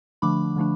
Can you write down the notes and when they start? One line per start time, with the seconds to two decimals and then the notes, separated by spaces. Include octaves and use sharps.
0.22 D3 F3 A3 D4 B5 D6
0.56 D3 F3 A3 D4